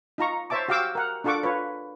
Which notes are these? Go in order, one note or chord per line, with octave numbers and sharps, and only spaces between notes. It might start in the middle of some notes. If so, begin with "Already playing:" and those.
D#4 F4 A#5 C#6
C5 C#5 E5 A5 D6
F#4 G4 F5 G5 D6 E6
A#4 F#5
D4 F4 A4 F#5 C#6 D6
F4 B4 C#5